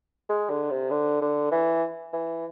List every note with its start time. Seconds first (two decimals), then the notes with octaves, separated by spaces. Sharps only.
0.30 G#3
0.50 D3
0.70 C3
0.90 D3
1.22 D3
1.52 E3
2.13 E3